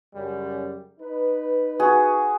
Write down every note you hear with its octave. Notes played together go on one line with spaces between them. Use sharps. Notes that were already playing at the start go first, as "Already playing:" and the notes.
F#2 C#3 G3
D#4 B4
F#4 G#4